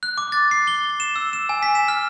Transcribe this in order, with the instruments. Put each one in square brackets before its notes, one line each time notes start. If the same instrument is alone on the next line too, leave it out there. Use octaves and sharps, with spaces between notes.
[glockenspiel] F#6
D6
A6
C7
G7
E7
E6
E7
G#5
B6
E7
F6